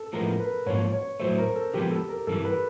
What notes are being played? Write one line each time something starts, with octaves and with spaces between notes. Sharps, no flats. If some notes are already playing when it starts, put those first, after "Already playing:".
Already playing: A4
A2 F3 G#3 B3 A#4
B4
G#2 F3 A#3 C#5
C#5
A2 F#3 A3 C5
A#4
A4
D3 F3 G#3 B3 G4
A4
A#4
G2 E3 G3 A4
B4